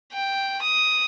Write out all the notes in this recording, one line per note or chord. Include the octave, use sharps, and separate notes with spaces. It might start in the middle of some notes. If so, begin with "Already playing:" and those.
G5
D#6